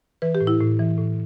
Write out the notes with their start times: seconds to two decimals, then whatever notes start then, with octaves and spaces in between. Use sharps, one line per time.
0.22 E3 B4
0.35 G4
0.41 A2
0.47 E4
0.60 A2
0.79 E3
0.98 A2